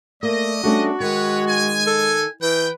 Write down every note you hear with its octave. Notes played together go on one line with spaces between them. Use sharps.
A3 A#3 D5 D#5
G3 A3 C#4 D4 F#4
D#3 G#3 B4 C#5
G#5
A4
E3 B4 G5